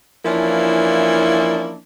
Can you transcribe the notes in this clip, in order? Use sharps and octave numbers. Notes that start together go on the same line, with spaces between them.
E3 F3 A#3 C#4 D4 E4